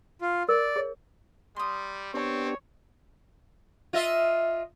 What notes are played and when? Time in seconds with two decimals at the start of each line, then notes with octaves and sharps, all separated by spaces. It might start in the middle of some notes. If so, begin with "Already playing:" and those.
0.21 F4
0.49 A#4 D5
0.76 G#4 C#5
1.56 G3 C6 D#6
2.14 B3 C4 D4 G4 C#5
3.93 F4 D#5 E5